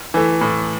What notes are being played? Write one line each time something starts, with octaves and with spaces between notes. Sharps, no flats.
E3 A3
A2